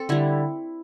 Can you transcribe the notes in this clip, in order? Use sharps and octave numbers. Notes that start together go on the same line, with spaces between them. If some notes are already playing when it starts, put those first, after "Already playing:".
Already playing: C4 A4
D3 G3 E4